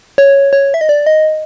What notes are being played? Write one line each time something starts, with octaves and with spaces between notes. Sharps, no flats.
C#5
C#5
E5
D#5
D5
D#5